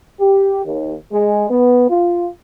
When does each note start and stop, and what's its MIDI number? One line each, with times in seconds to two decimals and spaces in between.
0.20 0.61 67
0.66 0.94 39
1.12 1.48 56
1.50 1.88 59
1.90 2.28 65